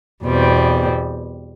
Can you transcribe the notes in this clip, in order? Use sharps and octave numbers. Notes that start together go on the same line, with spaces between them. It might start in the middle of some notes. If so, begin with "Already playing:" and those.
E2 B2 G3 C4